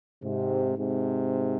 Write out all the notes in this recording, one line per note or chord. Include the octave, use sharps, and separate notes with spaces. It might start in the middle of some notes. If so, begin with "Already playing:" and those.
G#2 C3
G#2 C3